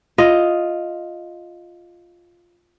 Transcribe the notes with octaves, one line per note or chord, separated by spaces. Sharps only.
F4 D#5